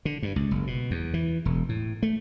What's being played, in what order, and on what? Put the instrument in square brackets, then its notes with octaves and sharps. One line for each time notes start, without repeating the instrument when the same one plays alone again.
[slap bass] D3
G2
C#2
F#1
B2
E2
E3
E1
A2
A3